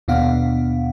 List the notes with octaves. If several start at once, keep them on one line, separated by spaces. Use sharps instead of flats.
D#2 B2 B3 D4 F5 F#5